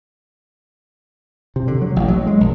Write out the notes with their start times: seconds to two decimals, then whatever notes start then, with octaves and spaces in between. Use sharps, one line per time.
1.56 C3
1.68 D3
1.82 F#3
1.96 A1
2.08 F#3
2.27 G#3
2.41 A#1